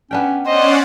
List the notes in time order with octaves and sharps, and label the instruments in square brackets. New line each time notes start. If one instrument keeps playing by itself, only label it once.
[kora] B3 D4 G5 [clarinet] C#4
[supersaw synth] C#4 D5 F#5 [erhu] C5 [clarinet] D#5